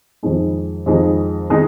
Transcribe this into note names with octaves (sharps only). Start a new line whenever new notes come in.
F2 D#3 G#3 D#4
F2 D#3 G#3 D#4
D#3 G#3 D#4